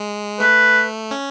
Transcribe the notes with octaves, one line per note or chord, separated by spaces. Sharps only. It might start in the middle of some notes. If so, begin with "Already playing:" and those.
Already playing: G#3
A3 B4
C#4